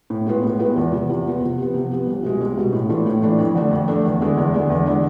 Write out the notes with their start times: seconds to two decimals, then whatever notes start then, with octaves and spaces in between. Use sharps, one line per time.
0.10 A2
0.26 G#3 B3 F4 B4
0.44 A2
0.59 G#3 B3 F4 B4
0.76 E2
0.92 C3 F3 B3 F4
1.09 E2
1.25 C3 F3 B3 F4
1.41 C3
1.58 F3 B3
1.74 C3
1.91 F3 B3
2.07 C2
2.23 B2 G#3
2.40 C2
2.57 B2 G#3
2.73 A2
2.89 E3 A3 D4 F4
3.06 A2
3.22 E3 A3 D4 F4
3.39 F2
3.55 D3 A3 D4
3.71 F2
3.88 D3 A3 D4
4.05 E2
4.21 D3 G#3 D4
4.37 E2
4.54 D3 G#3 D4
4.70 E2
4.86 D3 G#3 D4